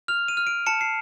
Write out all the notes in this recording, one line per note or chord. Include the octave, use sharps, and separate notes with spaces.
F6 F7
D#7
F6
D7
A5 C#7
C7